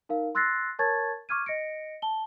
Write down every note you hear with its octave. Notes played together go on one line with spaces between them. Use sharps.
D#4 A#4 F5
C6 E6 F#6 A6 A#6 C7
A#4 C#5 A5 C#6 G#6 A6
C#6 D6 F6 G#6 D#7
D#5 A#6 C#7 D7
A5 G7